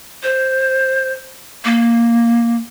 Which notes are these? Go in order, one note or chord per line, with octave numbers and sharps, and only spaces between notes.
C5
A#3